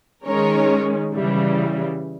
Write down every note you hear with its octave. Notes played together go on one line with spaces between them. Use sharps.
D#3 G#3 C#4 A#4 C#5
C#3 E3 G3